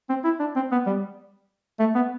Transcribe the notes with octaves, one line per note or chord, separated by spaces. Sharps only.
C4
E4
D4
C4
B3
G3
A3
B3